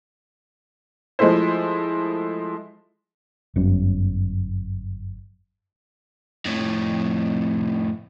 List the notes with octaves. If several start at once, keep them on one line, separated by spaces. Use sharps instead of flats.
F3 G#3 A3 E4 C5
G1 F#2 F#3 C#4
F2 A2